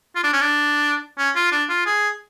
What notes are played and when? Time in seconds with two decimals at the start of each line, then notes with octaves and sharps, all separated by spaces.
0.16 F4
0.24 D4
0.33 C#4
0.41 D4
1.18 C#4
1.36 F4
1.52 D4
1.69 F4
1.86 G#4